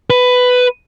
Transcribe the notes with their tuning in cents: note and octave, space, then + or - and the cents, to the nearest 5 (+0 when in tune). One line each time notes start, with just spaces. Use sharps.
B4 +10